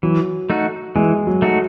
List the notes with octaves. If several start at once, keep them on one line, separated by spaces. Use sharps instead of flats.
E3 F#3
A3 D#4 F#4
E3 G#3
F#3
A3 D#4 F#4